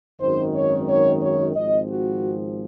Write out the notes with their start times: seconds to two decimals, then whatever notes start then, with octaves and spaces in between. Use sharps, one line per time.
0.20 G#1 F#2 D#3 C5
0.54 C#5
0.88 C#5
1.22 C#5
1.56 G#1 G#2 F3 C4 D#5
1.88 F#4